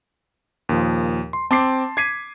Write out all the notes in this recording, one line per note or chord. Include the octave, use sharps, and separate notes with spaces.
D#2 A#2 F3
C6
C4 A5 C6 D6 C7
D6 G#6 B6 C7 D#7